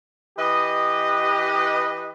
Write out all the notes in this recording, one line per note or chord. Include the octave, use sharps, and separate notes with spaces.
E3 G4 B4 D#5